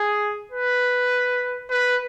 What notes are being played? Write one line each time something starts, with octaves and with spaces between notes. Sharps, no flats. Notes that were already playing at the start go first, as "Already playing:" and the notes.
Already playing: G#4
B4
B4